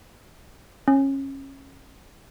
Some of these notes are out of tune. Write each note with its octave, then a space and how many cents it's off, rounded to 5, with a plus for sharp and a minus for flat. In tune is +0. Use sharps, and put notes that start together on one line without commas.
C#4 -25